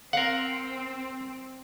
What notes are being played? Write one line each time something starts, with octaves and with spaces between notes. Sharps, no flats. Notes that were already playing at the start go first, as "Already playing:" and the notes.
C4 A#4 F5 F#5